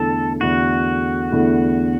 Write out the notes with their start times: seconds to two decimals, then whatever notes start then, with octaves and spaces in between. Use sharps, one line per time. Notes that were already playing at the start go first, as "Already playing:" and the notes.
Already playing: E2 D3 A3 E4 A4
0.41 E2 D3 A3 E4 F#4
1.31 E2 D3 A3 E4